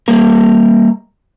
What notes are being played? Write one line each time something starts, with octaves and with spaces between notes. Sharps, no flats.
G3 A#3 A#4